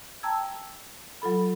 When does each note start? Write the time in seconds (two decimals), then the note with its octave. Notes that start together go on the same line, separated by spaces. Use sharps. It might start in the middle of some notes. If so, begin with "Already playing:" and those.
0.23 G5 A5 A#5 E6 G#6
1.22 F#3 F4 A4 B5